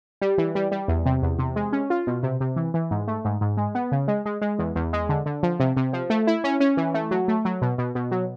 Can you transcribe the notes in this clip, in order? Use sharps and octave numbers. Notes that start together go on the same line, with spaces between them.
G3
E3
G3
G3
E2
C3
E2
C3
G#3
C#4
F4
B2
C3
C3
E3
E3
G#2
A3
G#2
G#2
G#3
B3
C#3
G#3
G#3
G#3
E2
E2
G#3
D3
D3
F3
C3
C3
F3
A3
E4
C#4
C#4
E3
A3
F#3
A3
F#3
B2
B2
B2
F#3